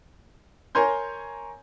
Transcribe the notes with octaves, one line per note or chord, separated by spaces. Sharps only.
A#4 C#5 G#5 A#5 C6 G6